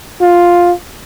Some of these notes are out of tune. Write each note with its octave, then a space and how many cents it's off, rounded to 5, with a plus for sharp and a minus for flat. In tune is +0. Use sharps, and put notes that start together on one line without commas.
F4 +5